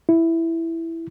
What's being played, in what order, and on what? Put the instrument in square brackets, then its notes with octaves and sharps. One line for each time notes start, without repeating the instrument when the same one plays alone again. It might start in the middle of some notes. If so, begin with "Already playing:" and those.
[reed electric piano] E4